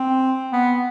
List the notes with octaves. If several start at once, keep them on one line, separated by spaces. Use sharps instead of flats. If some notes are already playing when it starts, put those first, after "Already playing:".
Already playing: C4
B3